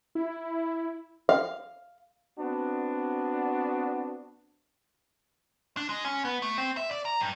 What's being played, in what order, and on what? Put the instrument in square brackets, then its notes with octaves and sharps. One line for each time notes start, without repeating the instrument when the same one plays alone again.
[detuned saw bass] E4
[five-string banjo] F5
[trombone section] B3 C4 D4 F#4
[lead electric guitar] D4
G#3
C#4
B3
A3
C4
E5
D5
A#5
G2